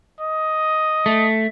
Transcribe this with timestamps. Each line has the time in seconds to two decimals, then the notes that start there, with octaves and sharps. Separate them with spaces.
0.20 D#5
1.06 A3